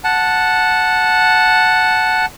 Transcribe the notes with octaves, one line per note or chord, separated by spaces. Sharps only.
F#5 A5